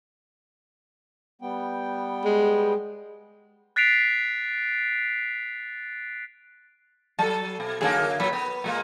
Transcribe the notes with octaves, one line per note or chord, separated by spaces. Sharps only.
G3 B3 G5
G#3
F#6 A6 B6 C7 D7 F7
F#3 A4 A5
B2
F#2 D3 A#3 G#4 A4
A#2 F#3 B5
B3
A#2 G#3 A#3